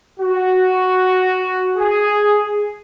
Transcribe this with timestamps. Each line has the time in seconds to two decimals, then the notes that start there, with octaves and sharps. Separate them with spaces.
0.20 F#4
1.77 G#4